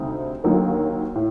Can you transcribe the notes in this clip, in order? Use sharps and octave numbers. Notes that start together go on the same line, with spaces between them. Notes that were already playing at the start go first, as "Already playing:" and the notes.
Already playing: D2 C3 G3 C4 D#4
D#2 D3 F#3 A#3 D#4
A2